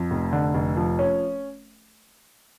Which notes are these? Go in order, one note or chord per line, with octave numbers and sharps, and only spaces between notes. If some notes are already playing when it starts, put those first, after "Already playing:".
Already playing: F2
F1
D3
F1
F3
C#4